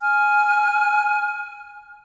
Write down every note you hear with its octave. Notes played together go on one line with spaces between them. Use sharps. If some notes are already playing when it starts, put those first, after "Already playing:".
G#5 F6